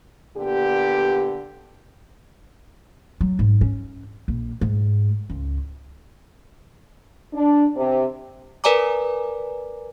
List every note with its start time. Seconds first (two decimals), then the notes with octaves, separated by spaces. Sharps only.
0.37 A#2 D3 B3 G4
3.21 F#3
3.39 G#2
3.61 C#4
4.28 A#1
4.61 G#2
5.30 C#2
7.34 D4
7.76 C3
8.64 A#4 B4 D5 G#5 A#5 D6